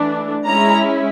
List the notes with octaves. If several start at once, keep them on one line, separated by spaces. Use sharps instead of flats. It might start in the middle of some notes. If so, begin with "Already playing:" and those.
Already playing: E3 A3 D4
G#3 C#4 E4 A#5